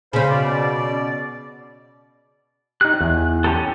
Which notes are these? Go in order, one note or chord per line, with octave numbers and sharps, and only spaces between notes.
C#3 C#4 C5 F5 B5
B2 D5
D#4 G4 F#6
E2 G#5
C#4 G4 A4